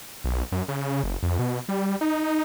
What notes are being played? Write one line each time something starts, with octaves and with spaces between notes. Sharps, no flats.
B1
F#2
C#3
F#1
F2
B2
G3
D#4